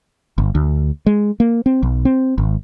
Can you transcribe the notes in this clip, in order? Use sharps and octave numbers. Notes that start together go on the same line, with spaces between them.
G1
D2
G#3
A#3
C4
B1
C4
G#1